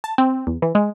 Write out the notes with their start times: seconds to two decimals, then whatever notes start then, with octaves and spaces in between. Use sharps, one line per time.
0.04 A5
0.18 C4
0.47 E2
0.62 E3
0.75 G#3